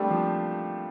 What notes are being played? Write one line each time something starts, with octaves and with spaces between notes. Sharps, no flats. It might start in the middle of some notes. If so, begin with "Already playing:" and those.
Already playing: G3 A3 A#3 C4 D4
F3